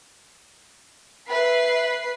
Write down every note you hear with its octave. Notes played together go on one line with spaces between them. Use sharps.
B4 E5 C7